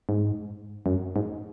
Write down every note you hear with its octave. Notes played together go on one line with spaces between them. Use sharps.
G#2
F#2
G#2